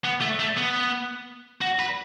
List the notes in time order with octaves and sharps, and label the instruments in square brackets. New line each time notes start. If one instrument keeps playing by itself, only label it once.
[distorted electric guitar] B3
A3
A3
B3
F#4
B4